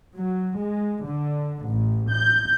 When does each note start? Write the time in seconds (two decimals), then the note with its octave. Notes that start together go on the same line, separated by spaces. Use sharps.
0.15 F#3
0.59 G#3
1.08 D3
1.67 A1
2.12 G6